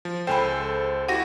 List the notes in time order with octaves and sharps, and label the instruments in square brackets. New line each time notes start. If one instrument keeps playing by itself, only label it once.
[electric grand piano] F3
[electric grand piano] C#2 A4 C5 [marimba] G5 G#5 B5
[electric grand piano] E4 F#4 G4 [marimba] F#5 A#6